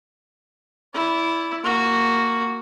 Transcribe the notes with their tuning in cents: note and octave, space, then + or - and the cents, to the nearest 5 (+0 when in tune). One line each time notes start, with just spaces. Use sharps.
E4 +0 D5 -25
A#3 -10 F#4 +0